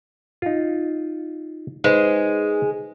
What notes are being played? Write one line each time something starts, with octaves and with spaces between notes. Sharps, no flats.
D#4 F4
G#3 D#4 B4 C5